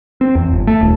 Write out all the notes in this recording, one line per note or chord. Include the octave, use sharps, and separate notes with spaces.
C4
E2
G1
A3
D#1